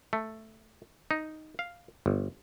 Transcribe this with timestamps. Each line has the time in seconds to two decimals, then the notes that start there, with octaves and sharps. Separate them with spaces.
0.13 A3
1.11 D#4
1.59 F5
2.06 G1